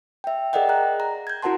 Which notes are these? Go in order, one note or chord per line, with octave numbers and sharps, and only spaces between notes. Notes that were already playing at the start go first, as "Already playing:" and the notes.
E5 G5
G#4 A#4 D5 D#5 F#5 G5
A#5 F#6
A#5
G6 G#6
E4 F#4 A#4 F#5 A5 C6